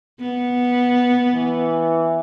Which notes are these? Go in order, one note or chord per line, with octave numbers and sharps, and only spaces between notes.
B3
E3